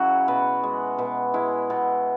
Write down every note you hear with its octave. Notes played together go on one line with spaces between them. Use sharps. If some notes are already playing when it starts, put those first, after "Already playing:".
Already playing: C#3 F#3 E4 F#4 G#4
B2 B4
G#3
B2 B4
G#3 E4
B2